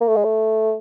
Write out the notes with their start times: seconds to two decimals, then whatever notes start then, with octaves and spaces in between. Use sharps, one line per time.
0.01 A#3
0.08 A3
0.17 G#3
0.24 A3